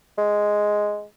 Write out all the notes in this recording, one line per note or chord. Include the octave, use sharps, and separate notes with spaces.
G#3